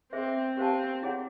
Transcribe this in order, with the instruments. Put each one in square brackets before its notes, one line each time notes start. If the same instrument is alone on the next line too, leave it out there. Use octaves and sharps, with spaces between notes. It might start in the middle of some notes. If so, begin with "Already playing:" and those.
[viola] C4 [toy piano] G#4 C5 E5
[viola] C4 [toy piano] G4 C5 F5 A5
[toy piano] E4 G#4 C#5 F#5